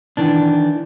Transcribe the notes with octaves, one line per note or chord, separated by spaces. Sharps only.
D#3 E3 D4